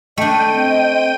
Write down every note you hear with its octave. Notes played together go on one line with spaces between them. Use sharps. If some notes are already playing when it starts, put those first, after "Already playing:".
A3 D4 D#5 G5 D#7
C4